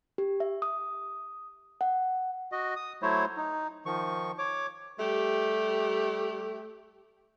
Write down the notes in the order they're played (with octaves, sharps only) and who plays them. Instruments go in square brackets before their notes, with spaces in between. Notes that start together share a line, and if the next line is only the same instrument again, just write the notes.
[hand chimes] G4
E5
D#6
F#5
[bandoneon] F#4 D#5
D#6
F#3 A3 E4 C5 C#5
D#4
D#3 F3 C#6
C#5 D6
[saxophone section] G3 A3 G4